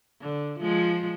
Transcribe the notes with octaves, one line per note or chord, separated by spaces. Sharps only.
D3
F3 G#3